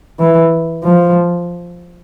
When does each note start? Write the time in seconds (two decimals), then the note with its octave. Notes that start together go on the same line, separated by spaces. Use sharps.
0.19 E3
0.84 F3